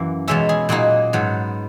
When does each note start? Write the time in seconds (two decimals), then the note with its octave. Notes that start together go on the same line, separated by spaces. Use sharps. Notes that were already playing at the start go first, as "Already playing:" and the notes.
Already playing: F#2 E3 A#3
0.28 E2 B2 G#3 C#4 E5
0.49 G#4
0.69 A#2 F#3 A#3 D#4
1.13 G#2 F#3 B3